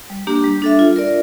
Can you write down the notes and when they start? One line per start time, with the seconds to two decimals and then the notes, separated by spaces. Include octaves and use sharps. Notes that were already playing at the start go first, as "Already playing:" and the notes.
0.10 G3
0.27 A#3 D4 G4
0.44 G3
0.62 D4 A4 E5
0.79 F4
0.96 A#4 D5